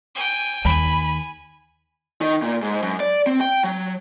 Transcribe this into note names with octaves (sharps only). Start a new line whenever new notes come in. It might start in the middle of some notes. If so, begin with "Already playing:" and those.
G5 G#5
D#2 G#5 B5
D#3
A#2
G#2
F#2
D5
C4
G5
F#3